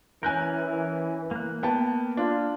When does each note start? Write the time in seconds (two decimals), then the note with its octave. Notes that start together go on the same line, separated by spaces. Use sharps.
0.23 E3 C#4 A#4 G#5 F#6 G6
1.31 A#3 F#6
1.63 B3 G5 A5
2.17 D4 F4